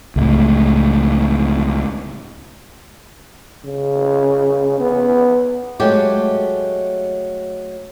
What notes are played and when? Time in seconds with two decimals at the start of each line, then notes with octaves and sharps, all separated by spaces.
0.16 C#2 A2
3.65 C#3
4.80 B3
5.80 F#3 G#3 A3 G4